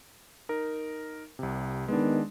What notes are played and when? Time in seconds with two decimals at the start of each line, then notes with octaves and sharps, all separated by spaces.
0.49 D#4 A#4
1.39 C2 C3
1.88 D#3 G#3 B3 D4